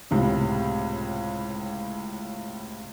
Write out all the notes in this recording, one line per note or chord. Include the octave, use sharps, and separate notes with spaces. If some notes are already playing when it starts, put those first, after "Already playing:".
C#2 A2 C3